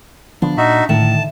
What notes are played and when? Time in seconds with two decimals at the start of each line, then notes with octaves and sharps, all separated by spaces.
0.42 D3 F3 B3 D4
0.57 A#2 D#4 F#4 E5
0.89 A2 D3 D#3 A5